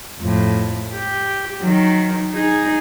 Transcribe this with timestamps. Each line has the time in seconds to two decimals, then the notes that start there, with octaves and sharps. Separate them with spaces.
0.20 F2 A2
0.93 G4
1.61 D#3 F#3
2.32 D#4 G#4